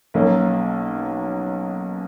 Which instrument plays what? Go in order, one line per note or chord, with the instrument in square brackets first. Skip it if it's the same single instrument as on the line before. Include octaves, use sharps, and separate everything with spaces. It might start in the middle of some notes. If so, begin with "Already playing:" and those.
[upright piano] B1 B2 F#3 A#3 C#4